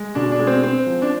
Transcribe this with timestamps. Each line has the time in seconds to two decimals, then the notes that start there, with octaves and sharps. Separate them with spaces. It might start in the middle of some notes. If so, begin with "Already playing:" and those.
Already playing: G#3
0.15 B2 D4
0.32 D4
0.39 G#3
0.47 C4
0.63 G#3 C4
0.87 F3
1.02 D4